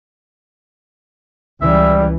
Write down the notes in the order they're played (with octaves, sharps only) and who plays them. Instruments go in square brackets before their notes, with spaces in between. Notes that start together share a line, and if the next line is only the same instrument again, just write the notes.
[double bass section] C#2 E3 [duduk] G3 [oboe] E5